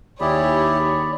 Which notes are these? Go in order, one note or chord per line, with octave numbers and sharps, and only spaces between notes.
D#2 E4 G4 G#4 C#5 D5 B5